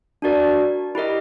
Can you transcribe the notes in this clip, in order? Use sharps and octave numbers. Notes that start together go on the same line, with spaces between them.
D4 F#4 A#4 D5
E4 G4 A#4 D#5